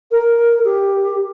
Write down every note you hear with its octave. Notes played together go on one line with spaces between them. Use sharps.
A#4
G4